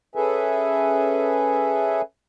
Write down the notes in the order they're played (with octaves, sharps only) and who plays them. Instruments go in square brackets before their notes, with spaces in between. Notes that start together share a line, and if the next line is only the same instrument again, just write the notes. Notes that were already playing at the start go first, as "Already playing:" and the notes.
[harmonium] C#4 G#4 A4 B4 E5 G#5